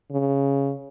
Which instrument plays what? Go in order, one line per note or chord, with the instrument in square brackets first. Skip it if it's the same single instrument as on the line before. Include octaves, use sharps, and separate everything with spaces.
[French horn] C#3